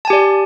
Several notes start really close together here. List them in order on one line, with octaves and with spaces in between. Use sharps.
A5 G#5 G4 D5